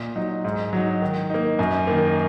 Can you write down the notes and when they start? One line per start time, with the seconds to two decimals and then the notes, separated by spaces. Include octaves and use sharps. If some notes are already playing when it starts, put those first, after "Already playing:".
Already playing: A#2
0.16 F#3 D#4
0.45 G#2
0.73 F#3 D#4
1.02 D#3
1.30 A#3 D#4
1.59 F#2
1.87 D#3 A#3